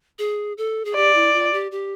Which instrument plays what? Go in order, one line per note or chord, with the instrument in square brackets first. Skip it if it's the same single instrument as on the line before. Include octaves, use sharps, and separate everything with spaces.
[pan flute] G#4
A4
G#4
[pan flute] G4 [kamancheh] D5
[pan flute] E4
F4
G4
G4